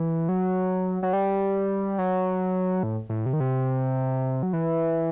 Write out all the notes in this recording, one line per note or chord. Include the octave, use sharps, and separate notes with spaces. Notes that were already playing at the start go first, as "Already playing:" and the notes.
Already playing: E3
F#3
F#3
G3
F#3
A2
A2
C3
D#3
C3
F#3
E3